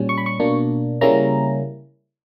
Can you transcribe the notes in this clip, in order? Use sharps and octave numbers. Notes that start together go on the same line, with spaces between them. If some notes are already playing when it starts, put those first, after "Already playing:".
Already playing: A#2 G3 C#4
C#6
B5
C#6
B2 A#3 D4
C#3 G3 A#3 C#4 E4 A#5